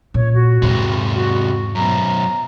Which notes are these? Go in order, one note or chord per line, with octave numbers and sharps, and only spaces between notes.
A#2 C#3 C#5
F#4
E2 G#2 C3 G#3
F#4
F#2 B2 A#5